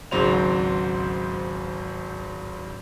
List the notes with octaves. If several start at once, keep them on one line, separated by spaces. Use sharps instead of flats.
G#1 C#2 G#2 F#3 C5 F7